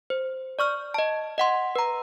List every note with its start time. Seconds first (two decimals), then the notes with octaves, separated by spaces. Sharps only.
0.10 C5
0.59 D5 C#6 F6
0.94 D#5 A5
1.38 D#5 F#5 C6
1.76 B4 A#5